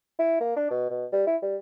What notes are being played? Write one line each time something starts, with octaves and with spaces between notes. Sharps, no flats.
E4
A#3
D4
B2
B2
G3
E4
G3